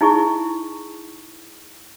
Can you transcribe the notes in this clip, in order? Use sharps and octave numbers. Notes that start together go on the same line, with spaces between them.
D#4 E4 G#4 C#6